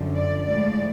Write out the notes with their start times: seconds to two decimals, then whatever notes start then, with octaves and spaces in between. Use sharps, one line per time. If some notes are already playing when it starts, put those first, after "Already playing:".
Already playing: F#2 D3 F3
0.15 D5
0.46 A2 F3 G#3 D5